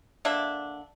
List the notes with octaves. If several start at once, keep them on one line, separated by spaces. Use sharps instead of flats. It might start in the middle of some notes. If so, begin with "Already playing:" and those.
D3 A#3 D4 E5